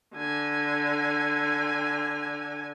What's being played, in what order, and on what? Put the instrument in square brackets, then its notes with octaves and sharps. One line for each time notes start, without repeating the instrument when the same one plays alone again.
[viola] D3 G#5